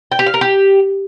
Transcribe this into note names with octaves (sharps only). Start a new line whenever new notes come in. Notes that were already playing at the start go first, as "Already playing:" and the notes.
G5
G4
F5
A#4
G4